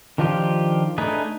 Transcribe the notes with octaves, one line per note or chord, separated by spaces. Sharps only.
D#3 F3 D4 F4 G4
A3 D4 D#4 G#4 B4